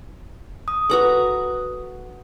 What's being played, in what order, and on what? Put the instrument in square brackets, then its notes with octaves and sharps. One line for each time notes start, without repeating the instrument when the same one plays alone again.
[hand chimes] D#6
[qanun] F#4 A#5 B5 [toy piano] G#4 A4 B4